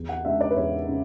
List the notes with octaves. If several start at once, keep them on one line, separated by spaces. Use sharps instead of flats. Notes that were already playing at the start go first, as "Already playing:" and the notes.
Already playing: E2
F#5
C#3 G#3 D4 E5
D5
B4
E2 C#5
C#3